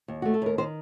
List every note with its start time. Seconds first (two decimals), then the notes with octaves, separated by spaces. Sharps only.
0.08 D#2
0.22 A3 F#4
0.34 A4
0.42 D#2 A#4
0.58 D#3 C5